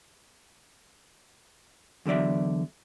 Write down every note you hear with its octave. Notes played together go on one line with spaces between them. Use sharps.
E2 D3 F#3 D5 E5